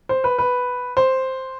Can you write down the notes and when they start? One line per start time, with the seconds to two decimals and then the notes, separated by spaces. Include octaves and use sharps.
0.09 C5
0.24 B4
0.38 B4
0.97 C5